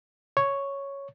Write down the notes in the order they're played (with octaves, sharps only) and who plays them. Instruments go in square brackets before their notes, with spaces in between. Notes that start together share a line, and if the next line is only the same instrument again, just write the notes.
[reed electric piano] C#5